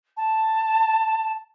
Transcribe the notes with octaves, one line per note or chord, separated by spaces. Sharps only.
A5